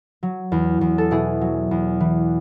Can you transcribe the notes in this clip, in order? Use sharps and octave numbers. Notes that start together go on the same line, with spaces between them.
F#3
E2
E2
A4
B2 E4 G#4
F#3
E2
E3